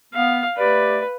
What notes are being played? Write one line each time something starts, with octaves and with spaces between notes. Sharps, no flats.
B3 F5
A3 G4 B4 D5